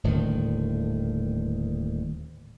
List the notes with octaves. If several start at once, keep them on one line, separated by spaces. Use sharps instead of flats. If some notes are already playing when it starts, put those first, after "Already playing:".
D#1 A2 D3 D#3